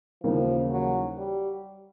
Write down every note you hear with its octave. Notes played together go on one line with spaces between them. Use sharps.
D#2 C#3 E3 F3 G3 A#3
F#3
G3